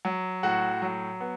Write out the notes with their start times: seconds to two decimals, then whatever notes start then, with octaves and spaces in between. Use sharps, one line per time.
0.05 F#3
0.43 A2 F#4 F#5
0.82 F#3
1.20 B3